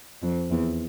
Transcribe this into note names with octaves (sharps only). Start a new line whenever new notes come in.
F2
E2